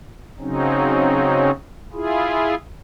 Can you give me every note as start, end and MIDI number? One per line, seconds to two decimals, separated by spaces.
0.40 1.51 49
0.40 1.51 54
0.40 1.51 60
0.40 1.51 61
0.40 1.51 63
1.93 2.55 64
1.93 2.55 65
1.93 2.55 68